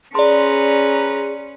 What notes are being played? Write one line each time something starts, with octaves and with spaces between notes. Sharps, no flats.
C#4 G#4 B4 D5 A#5 C6